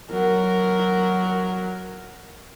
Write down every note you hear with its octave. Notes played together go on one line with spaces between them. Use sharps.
F#3 A#4